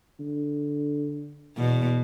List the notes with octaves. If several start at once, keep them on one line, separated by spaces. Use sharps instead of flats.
D3
E2 B2